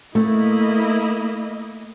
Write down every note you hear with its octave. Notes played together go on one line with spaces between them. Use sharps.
A3 A#3 E4 D#5